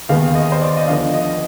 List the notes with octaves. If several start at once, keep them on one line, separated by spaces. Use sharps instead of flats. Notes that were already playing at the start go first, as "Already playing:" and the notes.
D#2 D#3 G#3 B3 F5
D#5
C5
D5
D#5
D2 D3 F3 B3 F5
D#5